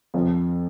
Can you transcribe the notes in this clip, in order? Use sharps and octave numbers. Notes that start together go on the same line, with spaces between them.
F2 F3